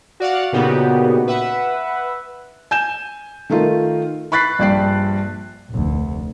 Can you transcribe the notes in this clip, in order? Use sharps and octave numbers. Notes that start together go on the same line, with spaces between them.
F#4 D5 F5 F#5
A#2 C#3 B3 D#4 F#4 G4
B4 E5 F#5
G#5 G6 E7
D#3 A3 D#4 F4 A#4
B5 C#6 F#6 A6 B6 C7
A#1 G2 D5 G5 C7
F1 D2